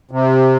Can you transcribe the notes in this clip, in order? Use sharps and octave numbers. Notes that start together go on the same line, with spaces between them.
C3